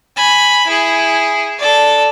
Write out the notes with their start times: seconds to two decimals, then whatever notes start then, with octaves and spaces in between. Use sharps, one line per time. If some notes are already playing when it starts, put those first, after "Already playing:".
0.16 G#5 B5
0.67 E4 G#4
1.59 A4 D5